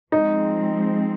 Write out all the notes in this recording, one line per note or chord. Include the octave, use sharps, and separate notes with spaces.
F3 G#3 C4 D#4